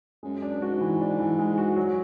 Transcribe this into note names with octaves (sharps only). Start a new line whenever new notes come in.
F#2 G#3
D4
G#2 F#4
E3
D4
E3
G#3
F#4
F#3